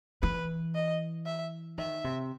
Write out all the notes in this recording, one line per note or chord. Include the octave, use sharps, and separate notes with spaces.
E3 B4
D#5
E5
D#3 E5
C3